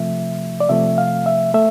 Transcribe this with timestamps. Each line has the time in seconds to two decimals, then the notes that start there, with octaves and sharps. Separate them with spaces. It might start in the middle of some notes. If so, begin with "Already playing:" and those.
Already playing: C3 F3 A3 E5
0.60 D5
0.69 C3 F3 A3 E5
0.98 F5
1.26 E5
1.54 A3 E5